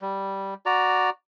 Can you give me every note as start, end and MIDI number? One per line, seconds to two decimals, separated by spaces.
0.02 0.54 55
0.66 1.10 66
0.66 1.10 74
0.66 1.10 82